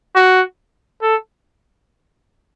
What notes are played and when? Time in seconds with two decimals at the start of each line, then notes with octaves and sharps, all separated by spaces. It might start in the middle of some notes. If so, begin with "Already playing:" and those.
0.15 F#4
1.02 A4